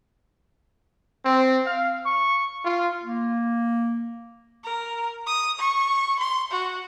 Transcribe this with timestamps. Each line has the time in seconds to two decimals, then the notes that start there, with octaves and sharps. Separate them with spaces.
1.25 C4
1.66 F5
2.05 C#6
2.63 F4
3.04 A#3
4.64 A#4
5.27 D#6
5.59 C#6
6.20 C6
6.51 F#4